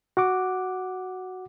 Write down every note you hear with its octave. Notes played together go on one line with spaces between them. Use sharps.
F#4 F#5 D6